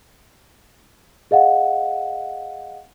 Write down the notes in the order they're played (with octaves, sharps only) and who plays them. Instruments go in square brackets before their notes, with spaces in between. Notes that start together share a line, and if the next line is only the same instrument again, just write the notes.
[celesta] G#4 D#5 F5 F#5